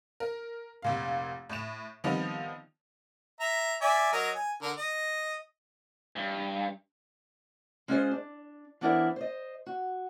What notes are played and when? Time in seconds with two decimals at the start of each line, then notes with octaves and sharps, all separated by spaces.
0.20 A#4
0.82 F1 A#2 F5
1.49 A2 E7
2.04 D#3 F3 G3 B3 C4 D#4
3.40 E5 A#5
3.81 D5 E5 G#5
4.13 F#3 A#4 D#5
4.35 G#5
4.62 D3 A#4
4.77 D#5
6.16 G2
7.88 G#3 C#4 F4 G#4 A#4 C5
8.11 D4
8.81 E3 B3 D4 E4 A#4 C5
9.16 C5 D#5
9.66 F#4